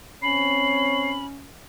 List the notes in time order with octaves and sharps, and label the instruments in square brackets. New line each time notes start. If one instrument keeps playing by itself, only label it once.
[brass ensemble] C4 C#5 [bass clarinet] C#4 [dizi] B5 [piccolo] C7